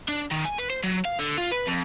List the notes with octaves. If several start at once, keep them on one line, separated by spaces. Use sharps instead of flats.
D4
D#3
G#5
B4
C5
F#3
F5
D3
F4
B4
F2